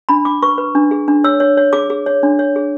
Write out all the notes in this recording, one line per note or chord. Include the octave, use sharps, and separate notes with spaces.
D4 B5
D4 D6
B4 C#6
B4
D4
G#4
D4
C#5 E6
C#5
C#5
G#4 D6
G#4
C#5
D4
C#5
G#4